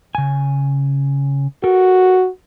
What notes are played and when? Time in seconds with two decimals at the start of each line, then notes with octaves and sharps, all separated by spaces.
0.15 C#3 G#5
1.64 F#4 A4 A#4